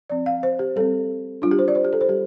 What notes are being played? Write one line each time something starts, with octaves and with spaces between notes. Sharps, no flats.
F3 C4 D5
F5
C5
G4
G3 C4 A4
G3 D4 F4
G4
C5
D5
C5
G4
A4
C5
G3 G4